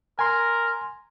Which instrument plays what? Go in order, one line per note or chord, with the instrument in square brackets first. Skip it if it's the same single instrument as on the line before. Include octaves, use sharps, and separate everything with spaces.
[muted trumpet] A#4 [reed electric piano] G#5 C6